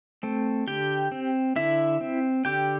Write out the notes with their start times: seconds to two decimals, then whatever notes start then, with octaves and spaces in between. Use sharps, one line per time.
0.23 A3 C4
0.68 D3 G4 G5
1.12 C4
1.56 D3 E4 E5
2.01 C4
2.45 D3 G4 G5